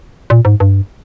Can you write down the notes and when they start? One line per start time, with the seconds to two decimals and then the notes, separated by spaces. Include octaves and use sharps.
0.30 A#2
0.45 G#2
0.60 G2